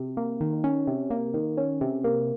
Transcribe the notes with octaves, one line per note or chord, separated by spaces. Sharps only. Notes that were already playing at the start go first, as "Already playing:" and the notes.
Already playing: C3
A#3
D#3
C#4
C3
A#3
D#3
C#4
C3
A#3